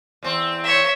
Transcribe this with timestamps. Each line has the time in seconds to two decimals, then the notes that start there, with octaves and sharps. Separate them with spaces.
0.23 E2 C4
0.64 C#5 E5